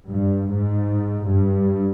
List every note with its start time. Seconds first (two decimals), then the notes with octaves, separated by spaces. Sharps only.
0.09 G2
0.49 G#2
1.28 G2